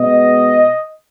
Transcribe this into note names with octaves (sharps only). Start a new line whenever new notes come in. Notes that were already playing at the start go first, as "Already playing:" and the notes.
Already playing: B2 G#3 B3 D#5